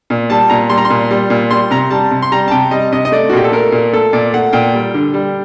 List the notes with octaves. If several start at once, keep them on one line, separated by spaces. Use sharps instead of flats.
A#2
G3 A5
A#2 A#5
G3 C6
A#5
C6
A#2
G3
A#2
G3 C6
C3 A#5
G3 A5
C3
C6
G3 A#5
A5
C3 G5
G3 D#5
C3 D#5
D#5
A3 D5
F#4
A#2 G4
A4
A3 A#4
A#2
A3 A4
A#2 D5
A3 F#5
A#2 G5
G3
D3
G3